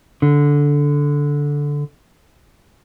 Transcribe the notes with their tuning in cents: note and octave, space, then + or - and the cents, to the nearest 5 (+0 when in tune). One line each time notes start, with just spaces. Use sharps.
D3 -10